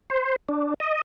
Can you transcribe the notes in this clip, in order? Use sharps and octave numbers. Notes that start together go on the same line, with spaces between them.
C5
D4
D#5